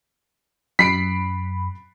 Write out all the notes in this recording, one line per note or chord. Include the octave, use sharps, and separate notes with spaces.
F#2 B5 B6 C7 D7